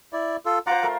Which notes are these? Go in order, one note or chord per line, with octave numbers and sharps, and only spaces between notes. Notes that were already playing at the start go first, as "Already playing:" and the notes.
E4 D5
F4 A4
F4 C5 F#5 A#5 D6
A3 A#4